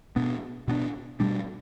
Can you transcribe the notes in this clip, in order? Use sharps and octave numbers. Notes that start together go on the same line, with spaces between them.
B2 B3 D4
B2 B3 D4
B2 G3 D4